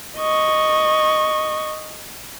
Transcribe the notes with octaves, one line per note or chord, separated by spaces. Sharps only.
D#5 C#6